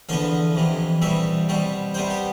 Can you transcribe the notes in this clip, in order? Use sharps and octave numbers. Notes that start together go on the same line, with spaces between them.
E2 D3 F3 B3 F5
F2 C3 E3
E2 B2 G3 C4 E5
B2 G3 C4
C3 G3 B3 C5
G4